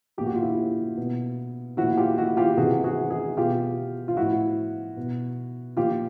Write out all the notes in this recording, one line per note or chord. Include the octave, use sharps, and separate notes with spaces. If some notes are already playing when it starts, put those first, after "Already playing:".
A#2 F3 G4
F#4
F4
E4 F#4
B2
A#2 F3 E4 F#4
F4 G4
E4 F#4
F4 G4
C3 E3 F#4 G#4
F#4 G#4
F#4 G#4
B2 F4 G4
F4
A2 F3 E4 F#4
B2
A#2 F3 F4 G4